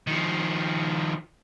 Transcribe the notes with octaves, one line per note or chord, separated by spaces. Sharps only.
D#3 F3